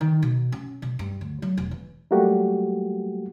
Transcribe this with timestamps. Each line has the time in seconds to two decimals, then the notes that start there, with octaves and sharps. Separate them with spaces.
0.01 D#3
0.22 B2
0.52 C#4
0.82 B2
0.99 G2
1.21 D2
1.42 F#3
1.57 E1
1.71 E3
2.11 F#3 G3 A3 A#3 F#4 G4